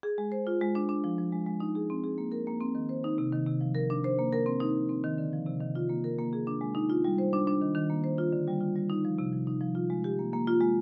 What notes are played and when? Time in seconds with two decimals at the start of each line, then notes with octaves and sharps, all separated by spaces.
0.03 G#4
0.18 G#3
0.32 C5
0.47 F4
0.61 G#3
0.75 D4
0.89 D4
1.04 F3
1.18 F3
1.32 G#3
1.47 G#3
1.60 D#4
1.75 G#4
1.90 C4
2.04 G#4
2.18 A#3
2.32 A#4
2.47 A#3
2.61 C4
2.75 D#3
2.89 C5
3.04 D#4
3.18 C3
3.33 D#3
3.47 C3
3.61 F3
3.75 A#4
3.90 D4
4.04 C5
4.19 A#3
4.33 A#4
4.46 C4
4.60 D#4
4.76 F3
4.89 C4
5.04 D#3
5.18 D3
5.33 F3
5.47 C3
5.60 D#3
5.75 F4
5.89 A#3
6.04 A#4
6.18 A#3
6.33 G#4
6.47 D4
6.61 G#3
6.75 D#4
6.90 F4
7.04 G3
7.18 C5
7.33 D4
7.47 D4
7.62 D#3
7.75 D#3
7.90 A#3
8.04 C5
8.18 F4
8.33 D3
8.47 G3
8.61 F4
8.76 G3
8.90 D#4
9.05 F3
9.18 C3
9.33 F3
9.47 D#4
9.61 F3
9.75 F4
9.90 G#3
10.04 G4
10.19 A#3
10.33 A#3
10.47 F4
10.61 G#3